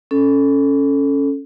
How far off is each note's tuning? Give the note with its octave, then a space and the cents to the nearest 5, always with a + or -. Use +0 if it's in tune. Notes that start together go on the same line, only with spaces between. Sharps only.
C#4 +0 A4 +0